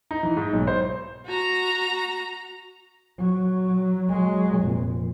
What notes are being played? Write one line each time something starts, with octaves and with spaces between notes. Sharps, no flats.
D#4
E3
G#2
B1
C5
F#4 A#5
F#3
F#3 G#3
F1 A#2